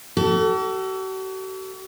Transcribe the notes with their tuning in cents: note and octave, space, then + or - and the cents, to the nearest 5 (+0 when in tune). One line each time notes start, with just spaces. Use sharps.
F#4 +45 A4 +15